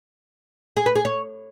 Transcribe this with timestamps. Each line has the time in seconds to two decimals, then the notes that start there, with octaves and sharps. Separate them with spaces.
0.77 G#4
0.86 B4
0.95 G#4
1.05 C#5